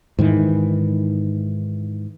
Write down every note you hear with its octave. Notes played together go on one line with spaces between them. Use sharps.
G#2 D#3 E3